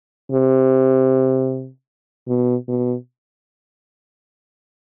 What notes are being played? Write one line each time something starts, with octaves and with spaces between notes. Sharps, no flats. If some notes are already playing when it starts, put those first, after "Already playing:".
C3
B2
B2